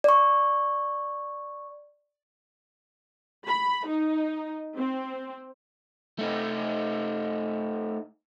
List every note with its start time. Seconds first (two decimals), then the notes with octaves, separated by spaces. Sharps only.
0.04 D5 C#6
3.47 B5
3.87 D#4
4.77 C4
6.19 A3 D#4